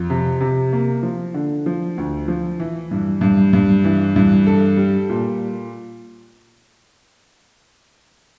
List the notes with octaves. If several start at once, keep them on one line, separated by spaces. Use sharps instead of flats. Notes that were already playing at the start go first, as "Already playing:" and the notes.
Already playing: F2
C3
C3
A#3
F3
D3
F3
D2
F3
E3
G2
G2
G2
E3
G2
A4
G3
A#2